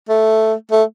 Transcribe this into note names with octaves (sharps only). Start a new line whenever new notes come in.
A3
A3